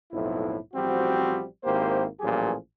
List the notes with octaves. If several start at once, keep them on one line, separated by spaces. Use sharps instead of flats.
B1 F2 A2 E4
A1 F3 G3 C4 F#4
G#1 A#3 E4 G4 C5
A1 A#2 F3 F#3 G4 G#4